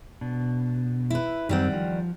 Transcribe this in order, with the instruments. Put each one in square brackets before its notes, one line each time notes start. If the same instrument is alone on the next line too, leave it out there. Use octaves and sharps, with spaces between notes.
[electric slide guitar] B2 D4
[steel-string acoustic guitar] E4 B4
[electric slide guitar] F#2 C4 [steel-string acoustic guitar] D#3 G3 F#5
[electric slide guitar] F3